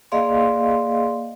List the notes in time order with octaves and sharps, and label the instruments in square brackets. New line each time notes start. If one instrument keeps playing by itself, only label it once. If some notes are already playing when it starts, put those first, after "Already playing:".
[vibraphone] A#3 G#4 D5 D#5 F5 C6